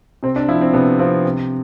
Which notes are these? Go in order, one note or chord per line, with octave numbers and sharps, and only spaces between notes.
C3 C4
D4
F3 E4
C4
C3 B3
F3 C4
C3